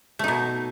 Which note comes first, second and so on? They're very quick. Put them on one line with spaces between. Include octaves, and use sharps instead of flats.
A3 D#4 B2